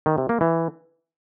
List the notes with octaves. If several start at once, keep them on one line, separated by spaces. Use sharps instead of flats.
D#3
C3
A#3
E3